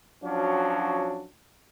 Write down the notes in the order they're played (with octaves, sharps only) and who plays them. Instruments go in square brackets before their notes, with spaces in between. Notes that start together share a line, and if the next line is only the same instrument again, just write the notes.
[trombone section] F3 F#3 C#4 D4 F#4